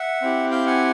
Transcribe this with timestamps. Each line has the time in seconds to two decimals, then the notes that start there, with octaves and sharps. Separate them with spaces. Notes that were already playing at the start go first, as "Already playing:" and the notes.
Already playing: E5 F#5
0.21 C4 E4 G4
0.51 F5 G5
0.67 F#5 G#5